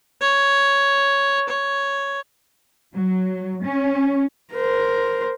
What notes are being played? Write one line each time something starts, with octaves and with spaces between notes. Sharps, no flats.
C#5
C#5
F#3
C#4
A#4 C5